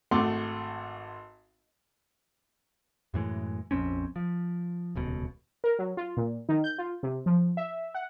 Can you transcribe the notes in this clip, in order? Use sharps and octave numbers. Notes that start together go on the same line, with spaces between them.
G#1 A3 F#5 C6 D6
F#2 A2 E3 G#3
A#1 F2 C4 C#4
F3
D#1 C#2 B2
A#4
F#3
F4
A#2
D#3
G6
F4
C3
F3
E5
F#5